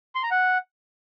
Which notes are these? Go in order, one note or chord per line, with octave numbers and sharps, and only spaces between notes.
C6
A#5
F#5